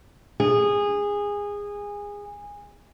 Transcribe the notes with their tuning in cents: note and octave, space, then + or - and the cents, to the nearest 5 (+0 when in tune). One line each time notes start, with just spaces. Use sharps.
G#4 -20